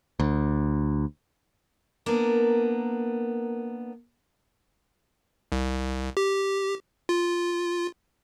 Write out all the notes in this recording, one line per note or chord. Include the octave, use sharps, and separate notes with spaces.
D2
A#3 B3 D4 A#4
C2
G4
F4